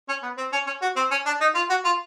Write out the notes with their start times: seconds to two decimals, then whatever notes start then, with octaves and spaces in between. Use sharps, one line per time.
0.09 C#4
0.23 B3
0.38 C4
0.53 C#4
0.67 C#4
0.82 F#4
0.96 C4
1.11 C#4
1.26 D4
1.41 D#4
1.55 F4
1.70 F#4
1.85 F4